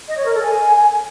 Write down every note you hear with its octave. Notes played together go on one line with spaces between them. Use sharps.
D#5
C#5
A#4
A4
G#5